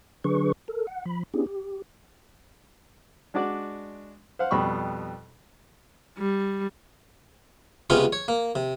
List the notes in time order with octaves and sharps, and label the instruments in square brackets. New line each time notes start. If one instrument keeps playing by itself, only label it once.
[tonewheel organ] D3 F#3 D4 G#4 B4 C#6
A4 A#4
F#5
F3 B5
B3 C#4 D4 E4 G4 G#4
G4
[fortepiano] G#3 D4 F#4 D5
C5 F5 F#5
F2 B2 G3 B5 C#6
[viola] G3
[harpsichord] C#2 C3 B3 C#4 F4 F5
C#5
A#3
C3